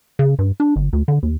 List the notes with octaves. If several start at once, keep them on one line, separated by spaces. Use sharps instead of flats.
C#3
G2
D4
G1
D2
D3
D#2